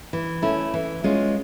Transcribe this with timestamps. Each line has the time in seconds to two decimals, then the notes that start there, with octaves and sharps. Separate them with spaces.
0.13 E3
0.42 A3 C#4 E4
0.74 E3
1.04 G#3 C#4 F4